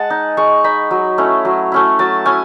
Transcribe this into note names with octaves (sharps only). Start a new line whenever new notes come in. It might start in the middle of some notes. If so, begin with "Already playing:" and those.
Already playing: G#3 F#5 A5
D#4
G#3 C#6
D#4 B5
F#3
A3 C#4 E4
F#3
A3 C#4 E4
F#3 A5
C#4 E4 G#5